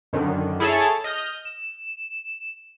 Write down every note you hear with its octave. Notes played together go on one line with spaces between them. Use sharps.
F#2 D3 D#3
E4 G#4 A4 C#5 A5
D#5 F6 G6
E7